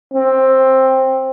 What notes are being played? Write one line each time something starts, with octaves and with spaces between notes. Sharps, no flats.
C4